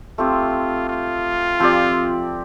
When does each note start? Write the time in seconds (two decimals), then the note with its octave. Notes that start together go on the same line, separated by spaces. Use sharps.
0.18 A3 C4 F4 G4
0.89 F4
1.60 F3 C4 G4 D5